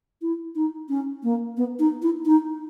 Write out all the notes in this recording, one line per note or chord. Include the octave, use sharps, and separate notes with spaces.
E4
D#4
C#4
A#3
B3
D#4
E4
D#4